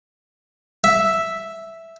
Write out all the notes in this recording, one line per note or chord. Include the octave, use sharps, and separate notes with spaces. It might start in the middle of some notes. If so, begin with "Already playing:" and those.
E5